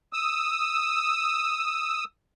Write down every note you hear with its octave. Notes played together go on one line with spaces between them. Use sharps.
D#6 E6